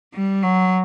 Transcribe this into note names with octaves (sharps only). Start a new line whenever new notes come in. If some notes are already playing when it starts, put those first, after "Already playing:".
G3
F#3